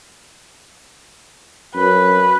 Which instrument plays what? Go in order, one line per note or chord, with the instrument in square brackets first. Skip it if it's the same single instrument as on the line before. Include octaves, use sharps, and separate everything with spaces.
[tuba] F#2 [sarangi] B4